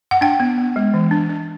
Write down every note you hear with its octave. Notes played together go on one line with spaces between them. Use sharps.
F#5
D4 G5
B3
B3
G#3
E3
D4
D4